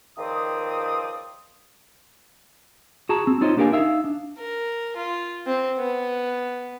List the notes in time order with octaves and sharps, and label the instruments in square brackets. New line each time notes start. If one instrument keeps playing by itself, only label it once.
[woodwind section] C#2 D#3 F3 C4 D5 D#6
[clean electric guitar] F#4 G#4 A5 A#5
C4
D#4 F4 C5 C#5 D#5
A#3 D4 G4 A#4 F5 G#5
D#4 E5 F5
D4
[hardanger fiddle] A#4
F4
C4
B3